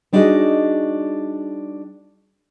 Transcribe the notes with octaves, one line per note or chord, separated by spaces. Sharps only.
G3 D4 D#4 F#4 G#4 D#5